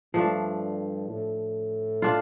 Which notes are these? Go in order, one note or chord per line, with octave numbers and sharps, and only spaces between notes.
G2 F3 A3 D4
A2
D4 F4